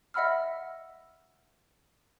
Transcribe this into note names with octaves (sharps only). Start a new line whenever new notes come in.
D#5 E5 F#5 B5 E6 F6